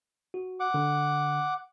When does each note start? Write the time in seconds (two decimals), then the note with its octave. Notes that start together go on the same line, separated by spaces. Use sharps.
0.34 F#4
0.60 F#5 D6
0.74 D3